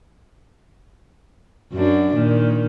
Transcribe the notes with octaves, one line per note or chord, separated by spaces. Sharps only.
F#2 F#3 D4
A#2 D#3